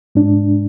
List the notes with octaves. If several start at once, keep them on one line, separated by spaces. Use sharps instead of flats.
G#2 G#3 D4